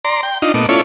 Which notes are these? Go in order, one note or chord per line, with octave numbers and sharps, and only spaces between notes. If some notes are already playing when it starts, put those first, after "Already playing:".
D5 A#5 C6
G5
D4 D#4 F4 D#5
A#2 A3 B3 D#5 D6
C#4 E4 F4 A4 C#5 D5